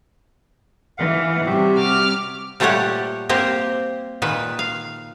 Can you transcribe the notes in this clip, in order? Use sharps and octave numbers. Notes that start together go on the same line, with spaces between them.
E3 F5 F#5
C3 G3 F#4 G4 E5
D6 F6
A#2 G3 A3 G4 C#5 F#5
A#3 C4 G4 A#4
A#2 D#3 B4
F5